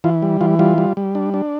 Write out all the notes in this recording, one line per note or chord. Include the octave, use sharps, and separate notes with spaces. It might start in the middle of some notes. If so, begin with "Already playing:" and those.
E3 F4
G3
E3 F4
G3 F4
G3
G3
D4
D4